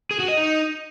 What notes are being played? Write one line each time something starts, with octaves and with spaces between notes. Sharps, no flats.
G#4
F#4
D#5
D#4